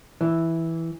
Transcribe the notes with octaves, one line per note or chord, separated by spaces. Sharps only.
E3